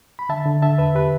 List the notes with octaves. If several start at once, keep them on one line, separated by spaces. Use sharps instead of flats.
B5
D3 E5 A5
D3
D3 E5 A5
E2 B4 E5
G4 B4